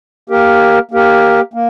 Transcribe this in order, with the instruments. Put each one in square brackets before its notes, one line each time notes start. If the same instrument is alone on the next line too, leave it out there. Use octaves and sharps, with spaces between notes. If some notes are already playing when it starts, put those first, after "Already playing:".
[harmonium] A#3 G4 A#4
A#3 G4 A#4
A#3